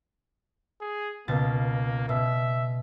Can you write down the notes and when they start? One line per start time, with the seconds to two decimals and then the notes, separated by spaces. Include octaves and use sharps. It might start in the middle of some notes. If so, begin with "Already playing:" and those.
0.81 G#4
1.28 C#2 B2 A#3 A6
2.09 B2 E5